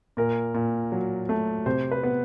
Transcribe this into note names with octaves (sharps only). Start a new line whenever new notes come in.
A#2 A#4
A#2
F#3
A3
C3 C5
B4
B3